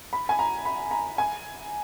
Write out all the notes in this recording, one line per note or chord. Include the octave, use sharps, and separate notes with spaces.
B5
G#5
A#5
B5
A#5
G#5